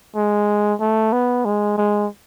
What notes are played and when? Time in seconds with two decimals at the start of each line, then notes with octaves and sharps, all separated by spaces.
0.15 G#3
0.80 A3
1.13 B3
1.45 G#3
1.78 G#3